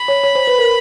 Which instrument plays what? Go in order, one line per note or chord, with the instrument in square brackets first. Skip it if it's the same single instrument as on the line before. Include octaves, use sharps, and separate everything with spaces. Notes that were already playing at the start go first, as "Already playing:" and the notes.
Already playing: [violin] B5
[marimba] C#5
C#5
C5
B4
A#4